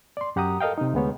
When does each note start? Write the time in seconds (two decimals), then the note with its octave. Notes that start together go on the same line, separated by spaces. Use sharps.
0.17 D5 C6
0.36 F#2 G4 F#5 A#5 D#6
0.61 A4 A#4 D#5 F5 G5
0.78 C3 D#4
0.94 D2 G#3 B3 C#5